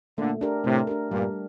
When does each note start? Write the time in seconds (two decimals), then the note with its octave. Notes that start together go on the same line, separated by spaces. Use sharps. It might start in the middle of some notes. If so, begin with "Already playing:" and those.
0.18 A#2 D3 A3
0.41 D4 G4 A#4
0.64 A2 C3 A3
0.87 D4 G4 A#4
1.10 G2 A#2 G3